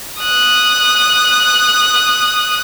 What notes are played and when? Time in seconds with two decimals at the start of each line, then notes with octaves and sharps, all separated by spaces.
0.22 D#6 F#6